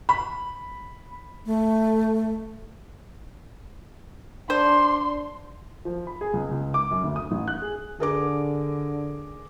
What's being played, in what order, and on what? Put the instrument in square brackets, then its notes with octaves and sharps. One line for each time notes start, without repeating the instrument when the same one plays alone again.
[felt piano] B5
[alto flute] A3
[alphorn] D4 [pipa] C5 [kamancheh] C6
[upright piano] F3
B5
G#4
C#2
C#2
D6
F#2
D2
D#6
A1
F#6
G#4
[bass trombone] D3 [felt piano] G#4 A#4 D6